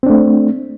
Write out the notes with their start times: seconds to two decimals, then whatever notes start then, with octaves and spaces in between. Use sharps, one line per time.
0.03 C4
0.06 D4
0.10 A3